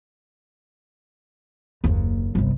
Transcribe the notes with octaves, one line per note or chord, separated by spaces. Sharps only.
F#1 D#2
G1 C2